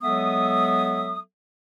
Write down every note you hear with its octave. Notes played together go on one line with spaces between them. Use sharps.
F#3 G#3 B3 A4 E5 D#6